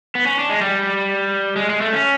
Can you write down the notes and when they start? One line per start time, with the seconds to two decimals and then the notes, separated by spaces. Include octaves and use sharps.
0.15 B3
0.26 C#4
0.39 D4
0.50 G#3
0.61 G3
1.56 G#3
1.69 G#3
1.81 A3
1.92 C#4